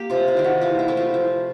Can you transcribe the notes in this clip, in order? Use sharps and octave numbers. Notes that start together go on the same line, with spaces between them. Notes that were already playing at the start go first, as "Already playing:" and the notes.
Already playing: A#3 G4
C3 F4
F4
D#3 G3
F#4
E3 F4
E4
A3 C4
F4
F3